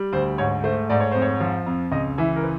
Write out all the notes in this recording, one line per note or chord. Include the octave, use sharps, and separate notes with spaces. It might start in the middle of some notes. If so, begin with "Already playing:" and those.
Already playing: G3
D2 C5
G#2 C#5
A3 C5
G#2 D5
C#5
F2 C5
C#5
F3
F2
C#2 D#5
E3 E5
A#4
B4